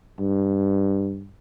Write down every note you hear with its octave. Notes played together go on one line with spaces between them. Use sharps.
G2